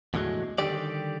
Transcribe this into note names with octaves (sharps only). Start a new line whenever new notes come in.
E2 A2 D3 F3 F#3 G#3
D3 D#3 G3 G4 D5